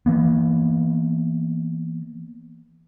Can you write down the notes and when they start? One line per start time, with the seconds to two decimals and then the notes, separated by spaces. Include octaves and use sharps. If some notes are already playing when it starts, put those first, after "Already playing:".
0.06 E3 A#3 B3